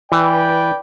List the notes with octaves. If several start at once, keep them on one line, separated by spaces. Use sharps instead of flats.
E3 B4 D5 G5